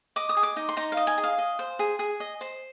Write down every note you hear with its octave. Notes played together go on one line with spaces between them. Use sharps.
D#5 D6
D#6
G#4
D6
D#4
C6
D#4 A#5
F5
D#5
G#5
G#4
F5
D#5
C5
G#4
G#4
D#5
C5